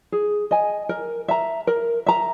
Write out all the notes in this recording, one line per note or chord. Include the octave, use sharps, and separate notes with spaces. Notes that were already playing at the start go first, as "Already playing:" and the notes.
G#4
D#5 G#5
A#4
E5 A#5
A#4
E5 A#5